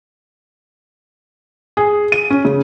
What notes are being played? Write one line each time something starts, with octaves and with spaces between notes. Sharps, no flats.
G#4
D#7
C#4
C#3